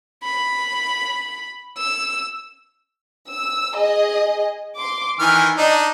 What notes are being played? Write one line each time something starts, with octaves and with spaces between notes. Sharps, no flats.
B5
E6
E6
G#4 D#5
C6 D6
D#3 E3 G#5 F6
D4 D#4 D#5